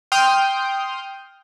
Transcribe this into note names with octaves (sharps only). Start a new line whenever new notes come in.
G5 C6 D#6 F6 G6